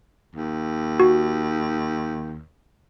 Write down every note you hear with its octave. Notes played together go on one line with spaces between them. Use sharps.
D#2
F#4